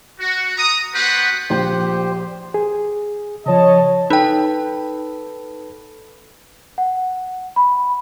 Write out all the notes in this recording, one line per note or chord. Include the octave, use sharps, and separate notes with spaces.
F#4
A#5 D#6
B3 F#4 G4 B4 C5 F#5
A#1 F4 G4 C5 G6
G#4
C#3 F3 C#5 D#5 A5
D#4 A4 B4 G5
F#5
B5